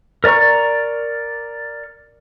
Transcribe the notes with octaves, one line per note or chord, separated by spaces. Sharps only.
A#4 D5 A#5 C#6